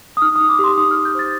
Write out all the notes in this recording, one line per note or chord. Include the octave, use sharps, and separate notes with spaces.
D#6
D#4 F6
D#4 D#6
D6
G4 C6
D#4 D#6
G4 F6
G6
C5 A6